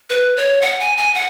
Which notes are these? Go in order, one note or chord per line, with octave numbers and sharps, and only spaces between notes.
B4
C#5
F#5
G#5
G#5
F#5